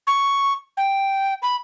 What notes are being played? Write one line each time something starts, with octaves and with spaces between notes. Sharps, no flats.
C#6
G5
B5